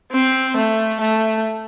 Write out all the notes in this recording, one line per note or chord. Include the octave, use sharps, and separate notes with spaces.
C4
A3
A3